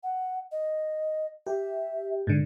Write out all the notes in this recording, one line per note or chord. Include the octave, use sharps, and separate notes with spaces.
F#5
D#5
G4 E5
G#2 D3